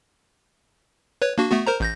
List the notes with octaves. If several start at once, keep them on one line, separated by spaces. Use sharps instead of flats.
B4 C#5
A#3 D4 F#4
A3 B3 F#4
A#4 C5 A#5
A1 G6 A#6